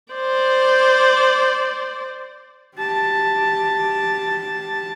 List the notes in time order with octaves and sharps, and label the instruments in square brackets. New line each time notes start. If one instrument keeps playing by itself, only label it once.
[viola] C5 D5
[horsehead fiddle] G4 A5